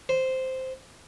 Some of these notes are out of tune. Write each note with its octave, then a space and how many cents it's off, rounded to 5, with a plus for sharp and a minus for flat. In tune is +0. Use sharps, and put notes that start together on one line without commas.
C5 -5